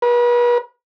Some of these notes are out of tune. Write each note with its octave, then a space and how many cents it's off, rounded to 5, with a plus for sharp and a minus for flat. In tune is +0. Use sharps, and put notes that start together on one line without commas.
B4 -40